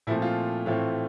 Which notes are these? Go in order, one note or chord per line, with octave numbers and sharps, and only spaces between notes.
A#2 F3 A3 C4 E4
F4
A2 E3 A3 C4 F4